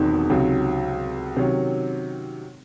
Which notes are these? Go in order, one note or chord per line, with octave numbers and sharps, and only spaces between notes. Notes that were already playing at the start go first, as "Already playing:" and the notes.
Already playing: E1 E2 D#3 F#3 C4
C#2 C3 F#3
C3 D#3 F#3 C#4